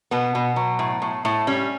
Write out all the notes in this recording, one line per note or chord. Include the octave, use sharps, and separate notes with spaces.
B2 B3
B2
F#3
A2
A2
A2
G3 C#4